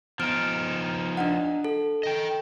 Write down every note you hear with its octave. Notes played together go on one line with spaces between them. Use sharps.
F3 B3 D#4 F6 D7
D4 D#5 F#5
A4
D#5 G5